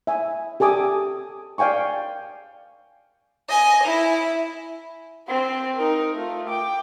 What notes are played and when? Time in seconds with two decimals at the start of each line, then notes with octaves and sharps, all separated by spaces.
0.07 E5 G#5
0.60 G4 A4 G#5 D6 D#6
1.58 D5 F5 G5 G#5 C#6
3.49 D#5 G#5
3.84 E4
5.28 C4 C5
5.76 D#4 A#4
6.15 A3 F4
6.48 G5 D6